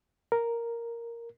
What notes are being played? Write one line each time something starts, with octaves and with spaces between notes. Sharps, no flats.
A#4